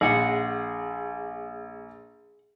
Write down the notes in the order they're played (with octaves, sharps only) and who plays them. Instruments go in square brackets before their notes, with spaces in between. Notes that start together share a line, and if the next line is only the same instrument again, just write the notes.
[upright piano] A#1 [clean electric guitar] G#4 F#5